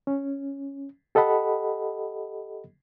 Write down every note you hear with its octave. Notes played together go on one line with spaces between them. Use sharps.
C#4
G4 A4 D#5 F#5 B5